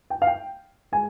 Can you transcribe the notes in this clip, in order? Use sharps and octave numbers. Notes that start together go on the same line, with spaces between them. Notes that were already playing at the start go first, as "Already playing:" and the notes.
G5
F5
G5
G#3 G#5